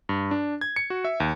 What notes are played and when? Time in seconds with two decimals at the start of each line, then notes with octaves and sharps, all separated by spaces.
0.09 G2
0.31 D4
0.61 G#6
0.76 C#7
0.90 F#4
1.05 E5
1.20 D#2